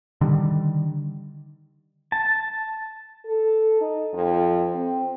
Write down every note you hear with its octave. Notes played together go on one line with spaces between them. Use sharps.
D3 D#3 G3
A5
A4
D#4
F2
C4